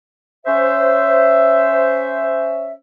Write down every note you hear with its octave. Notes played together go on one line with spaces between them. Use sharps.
C#4 C5 E5